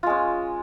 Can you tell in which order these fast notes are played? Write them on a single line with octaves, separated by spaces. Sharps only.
F4 G#3 C#4